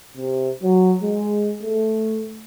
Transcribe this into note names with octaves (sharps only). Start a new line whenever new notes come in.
C3
F#3
G#3
A3